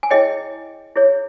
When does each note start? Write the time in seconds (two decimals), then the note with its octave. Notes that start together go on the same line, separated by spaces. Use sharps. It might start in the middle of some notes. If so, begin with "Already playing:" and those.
0.03 G#5
0.10 E4 G#4 C#5 D#5 G5
0.96 E4 G#4 C#5